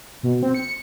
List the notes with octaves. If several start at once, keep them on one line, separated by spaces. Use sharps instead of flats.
B2
C4
C#7